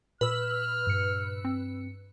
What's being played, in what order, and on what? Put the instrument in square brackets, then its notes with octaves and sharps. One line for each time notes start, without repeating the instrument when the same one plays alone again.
[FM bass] A#2 [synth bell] B4 E6 [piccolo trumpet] F6
[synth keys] G2 C#7
[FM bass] C4